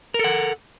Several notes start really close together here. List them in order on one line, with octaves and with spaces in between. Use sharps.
A#4 A4 F#5